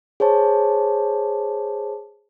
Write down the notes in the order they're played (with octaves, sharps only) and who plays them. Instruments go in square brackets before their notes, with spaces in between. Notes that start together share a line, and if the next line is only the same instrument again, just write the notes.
[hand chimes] G#4 C5 C#5 A5